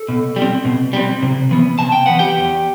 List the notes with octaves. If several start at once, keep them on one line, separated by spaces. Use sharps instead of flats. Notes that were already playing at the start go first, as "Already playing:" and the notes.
Already playing: A4
B2
G3
C4
B2
G3 C4
C3
E3 B3
C3 A5
G5
E3 B3 F#5
G4 G5
E2